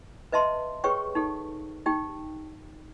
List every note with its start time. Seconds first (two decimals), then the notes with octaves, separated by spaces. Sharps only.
0.32 B4 D#5 E5 A5 C6
0.84 G4 G#4 B4 C#5 G5 C#6
1.15 D#4 G4 A4
1.86 D#4 G4 G5